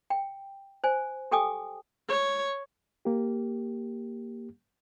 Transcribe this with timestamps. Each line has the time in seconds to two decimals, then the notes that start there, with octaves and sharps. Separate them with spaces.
0.10 G5
0.84 C5 G#5
1.31 G4 A4 G5 G#5 D6 D#6
2.09 C#5
3.05 A#3 G4